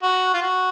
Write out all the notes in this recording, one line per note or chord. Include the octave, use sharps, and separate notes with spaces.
F#4
F4
F#4